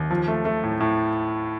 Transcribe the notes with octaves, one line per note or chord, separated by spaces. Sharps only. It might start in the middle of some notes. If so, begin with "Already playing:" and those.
Already playing: D#2
F3
A3
A3
A2
A2